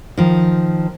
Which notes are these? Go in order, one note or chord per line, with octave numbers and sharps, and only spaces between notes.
D#3 F3